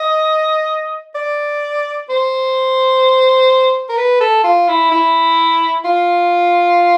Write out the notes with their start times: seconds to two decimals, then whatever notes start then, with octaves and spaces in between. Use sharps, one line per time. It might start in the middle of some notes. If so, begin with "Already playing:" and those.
Already playing: D#5
1.15 D5
2.09 C5
3.89 A#4
3.98 B4
4.20 A4
4.44 F4
4.68 E4
4.91 E4
5.84 F4